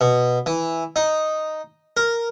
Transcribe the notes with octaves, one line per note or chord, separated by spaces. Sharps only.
B2
E3
D#4
A#4